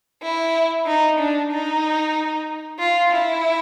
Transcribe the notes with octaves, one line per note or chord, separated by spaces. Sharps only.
E4
D#4
D4
D#4
F4
E4